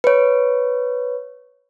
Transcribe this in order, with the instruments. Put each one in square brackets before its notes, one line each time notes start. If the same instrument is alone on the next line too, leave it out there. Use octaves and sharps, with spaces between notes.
[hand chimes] B4 C#5